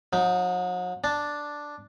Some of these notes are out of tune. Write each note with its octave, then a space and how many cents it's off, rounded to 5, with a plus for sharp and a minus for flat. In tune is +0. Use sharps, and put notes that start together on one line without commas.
F#3 -40 D#4 +0
D4 +0 A5 +0